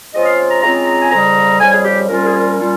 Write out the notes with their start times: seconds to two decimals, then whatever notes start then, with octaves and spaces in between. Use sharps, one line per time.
0.13 C#3 G#3 C4 F4 D#5
0.26 F5
0.50 A#5
0.62 C#3 G#3 C4 F4 A#5
0.86 A#5
1.00 G#5
1.11 F2 C#3 G3 A#5
1.60 F2 C#3 G3 G#5
1.74 G#4
1.85 G4
2.09 C2 A#2 G3 C#4 F4 A#4
2.26 G#4
2.34 A#4
2.58 A#2 G3 C#4 F4